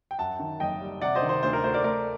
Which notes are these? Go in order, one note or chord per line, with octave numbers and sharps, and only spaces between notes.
G5
F#2 F#5 A5
D#3
F#1 D#5 G5
G3
C3 D5 F#5
C5 D#5
D#3
C5
D2 C5
A#4
A3 C5
A#4 D5
A3 A#4 D5